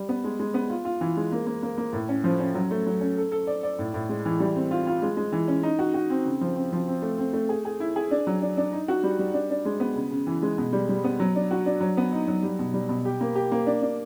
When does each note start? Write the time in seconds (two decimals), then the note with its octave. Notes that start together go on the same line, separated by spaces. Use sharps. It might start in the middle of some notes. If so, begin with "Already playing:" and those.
Already playing: G3
0.09 B3
0.24 G#3
0.40 G#3
0.54 B3
0.70 F4
0.85 F4
1.01 E3
1.17 G#3
1.32 A#3
1.47 A#3
1.63 A#3
1.78 A#3
1.93 A2
2.09 C#4
2.24 F3
2.40 C#4
2.55 F#3
2.71 A3
2.87 F#3
3.01 C#4
3.17 A4
3.32 A4
3.47 D5
3.63 D5
3.79 A2
3.94 A2
4.09 G#3
4.26 E3
4.40 G3
4.55 C4
4.71 F4
4.87 F4
5.02 G#3
5.17 G#3
5.32 E3
5.48 C#4
5.63 D#4
5.79 F#4
5.94 F#4
6.10 C4
6.26 C#3
6.41 F3
6.56 C4
6.72 F3
6.88 C4
7.02 A3
7.18 C4
7.33 A3
7.49 G#4
7.65 G#4
7.80 E4
7.96 G#4
8.11 D4
8.27 F#3
8.42 D4
8.57 D4
8.72 D#4
8.88 F#4
9.03 G3
9.19 G3
9.34 D4
9.50 D4
9.65 G#3
9.80 B3
9.95 C#3
10.11 C#3
10.27 E3
10.43 G#3
10.58 B2
10.73 G3
10.89 G3
11.04 B3
11.20 F#3
11.36 D4
11.51 F#4
11.66 D4
11.81 F#3
11.97 B3
12.12 D#4
12.28 F#3
12.43 G3
12.59 B2
12.74 G3
12.89 B2
13.05 G4
13.21 A#3
13.35 G4
13.52 A#3
13.67 D4
13.82 D4